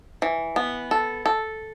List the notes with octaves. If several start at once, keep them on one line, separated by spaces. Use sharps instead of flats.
E3
B3
A4
A4